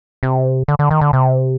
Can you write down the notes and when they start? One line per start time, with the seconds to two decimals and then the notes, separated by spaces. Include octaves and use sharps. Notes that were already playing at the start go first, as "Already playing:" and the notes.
0.23 C3
0.68 D3
0.79 D3
0.91 D#3
1.01 D3
1.13 C3